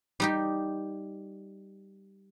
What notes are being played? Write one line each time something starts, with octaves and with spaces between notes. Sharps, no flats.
G3 D#4 G4